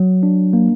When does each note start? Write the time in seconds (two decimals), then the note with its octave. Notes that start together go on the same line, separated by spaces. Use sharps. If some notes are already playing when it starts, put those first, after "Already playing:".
Already playing: F#3
0.23 D4
0.53 A#3